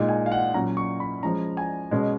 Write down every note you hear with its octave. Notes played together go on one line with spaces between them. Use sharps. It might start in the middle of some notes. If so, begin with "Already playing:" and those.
Already playing: A#2 G#3 D#4
G#5
F5
F#5
A#2 F#3 C#4 A#5
C#6
B5
F3 G#3 C#4 A#5
G#5
B2 G#3 C#4